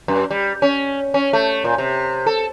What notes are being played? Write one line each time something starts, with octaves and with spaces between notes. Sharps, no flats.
F#2
G3
C#4
C#4
A3
A#2
C3
A4